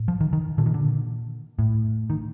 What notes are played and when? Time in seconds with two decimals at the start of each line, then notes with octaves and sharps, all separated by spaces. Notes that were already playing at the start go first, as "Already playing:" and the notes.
Already playing: A2
0.08 F3
0.21 D#3
0.33 D#3
0.58 A#2 D3
0.66 D#3
0.74 D3
1.59 A2
2.10 D#3